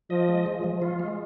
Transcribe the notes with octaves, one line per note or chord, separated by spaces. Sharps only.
F3 D#5
G#3
F3
F3
F4
G#3